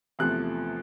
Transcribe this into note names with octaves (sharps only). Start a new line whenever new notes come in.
E2 C3 F3 A3 F#6